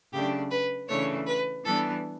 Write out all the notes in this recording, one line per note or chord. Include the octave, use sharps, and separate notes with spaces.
C#3 F#3 A3 D4 G4
B4
C#3 E3 A3 D4 C#5
B4
E3 G3 B3 D4 A4